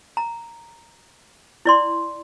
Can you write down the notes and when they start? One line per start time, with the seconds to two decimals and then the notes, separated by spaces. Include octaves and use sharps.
0.17 A#5
1.65 E4 D5 C6